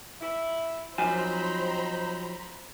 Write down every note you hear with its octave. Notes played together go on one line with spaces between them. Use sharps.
E4
F3 F#3 C4 D#4 C5 G#5 A#5 B5